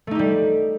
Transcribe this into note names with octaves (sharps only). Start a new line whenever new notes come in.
G3 A3 D#4 G4